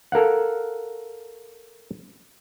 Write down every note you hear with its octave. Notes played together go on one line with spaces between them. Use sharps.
A4 A#4 F5 F#5